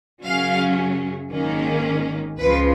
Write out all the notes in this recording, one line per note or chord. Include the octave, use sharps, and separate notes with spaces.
F#2 C#3 F#3 C#4 F5
G#1 G#2 D#3 A#3 C#4
C#2 C#3 F3 B4